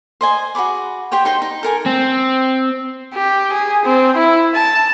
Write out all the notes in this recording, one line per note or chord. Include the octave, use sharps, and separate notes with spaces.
C5 D#5 G#5
F#4 G#4 B5 D6
G4 C5 C#5 G5
D#4 C5 G5 C6
D#4
A4 A#4 G#5
C4
G4
G#4
C4
E4
A5